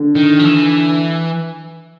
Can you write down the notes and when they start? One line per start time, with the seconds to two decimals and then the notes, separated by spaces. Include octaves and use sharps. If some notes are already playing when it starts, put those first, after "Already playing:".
Already playing: D3
0.15 D#3
0.39 F3
0.45 E3